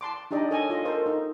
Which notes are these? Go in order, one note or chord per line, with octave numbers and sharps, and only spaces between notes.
A5 C6 D6
D4 D#4 G4 D5 D#5
A4 C#5 D#5 G#5
F4 D#5
A4 A#4 C5
D#4